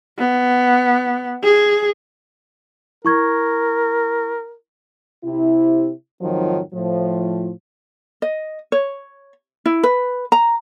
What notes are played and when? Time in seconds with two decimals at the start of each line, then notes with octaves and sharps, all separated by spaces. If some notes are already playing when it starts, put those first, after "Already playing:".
0.18 B3
1.44 G#4
3.05 E4 A#4 C#6 G#6
5.24 C3 E4
6.21 F2 G#2 D#3 F3 F#3
6.74 A2 F3
8.22 D#5
8.72 C#5
9.66 E4
9.83 B4
10.32 A#5